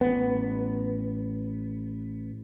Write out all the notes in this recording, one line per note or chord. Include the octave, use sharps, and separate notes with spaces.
A1 B3